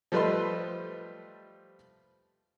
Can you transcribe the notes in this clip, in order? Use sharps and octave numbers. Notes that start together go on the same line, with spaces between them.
F3 G3 A3 B4 D#5 C6